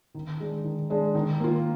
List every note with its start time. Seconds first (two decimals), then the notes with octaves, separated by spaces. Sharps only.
0.15 D#3
0.40 G#3 D4
0.64 D#3
0.90 G#3 D4
1.15 D#3
1.40 A#3 F4